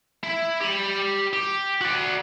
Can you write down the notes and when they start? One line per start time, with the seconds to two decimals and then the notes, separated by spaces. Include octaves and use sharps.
0.24 E4
0.62 G4 B5
1.33 G4
1.81 F#4 D5